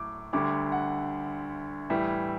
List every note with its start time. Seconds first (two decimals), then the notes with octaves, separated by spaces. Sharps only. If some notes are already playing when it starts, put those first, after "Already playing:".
Already playing: A2 F#3 D6
0.33 D2 D3 G3 D6
0.72 F#5
1.90 A2 E3 G3 E5